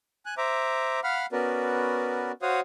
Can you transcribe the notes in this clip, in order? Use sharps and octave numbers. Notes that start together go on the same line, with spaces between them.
G#5 F#6
C5 E5 A#5 D6
F5 F#5 B5 F6
B3 C#4 F#4 A#4 B4 D5
F#4 C5 C#5 F5 F#5 D#6